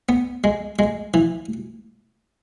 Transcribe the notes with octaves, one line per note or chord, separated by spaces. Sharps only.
B3
G#3
G#3
E3